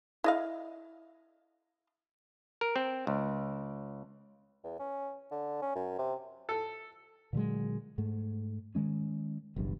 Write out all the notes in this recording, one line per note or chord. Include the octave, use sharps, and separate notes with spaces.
E4 D#5 F5
A#4
C4
C#2
E2
C#4
D3
C#4
F#2
C3
A4
A#2 D3 F#3 G#3
G#2 A3
D#3 G#3 C#4
F#1 B1 E2 G2